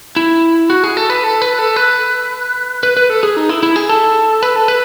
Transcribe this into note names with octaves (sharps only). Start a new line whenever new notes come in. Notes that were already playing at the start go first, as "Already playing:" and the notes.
E4
F#4
G#4
A4
B4
A4
B4
A4
B4
B4
B4
A4
G#4
D#4
E4
E4
G#4
A4
B4
A4
B4